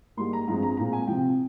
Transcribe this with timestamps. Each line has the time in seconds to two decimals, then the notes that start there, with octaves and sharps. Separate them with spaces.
0.17 G#2 G3 A#3 C6
0.33 A#5
0.48 G2 F3 G#3 C4 A#5
0.63 A#5
0.77 A#2 G#3 C4 A#5
0.93 G#5
1.07 C3 F3 C4 G5